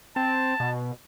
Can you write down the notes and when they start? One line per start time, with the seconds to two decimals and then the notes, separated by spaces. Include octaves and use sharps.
0.16 C4 A5
0.60 B2